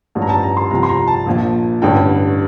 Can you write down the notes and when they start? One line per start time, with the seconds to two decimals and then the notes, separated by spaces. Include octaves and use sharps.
0.15 A1 G2 F3
0.22 A#5
0.29 A5
0.43 A#5
0.57 C6
0.71 C2 C3 F3 A#5
0.83 C6
0.89 A#5
1.07 A5
1.26 A#1 A#2 F3
1.82 A1 G2 D3 G5